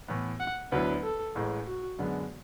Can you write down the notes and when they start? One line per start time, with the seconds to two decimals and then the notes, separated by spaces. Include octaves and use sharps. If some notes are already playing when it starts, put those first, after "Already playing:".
0.08 A2 E3 B3
0.40 F#5
0.72 D2 D3 F#3 B3 E4 B4
1.04 A4
1.35 A1 A2 G#3
1.67 F#4
1.99 F#2 D3 G#3 B3